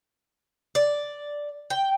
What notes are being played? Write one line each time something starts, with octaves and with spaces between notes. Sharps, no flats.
D5
G5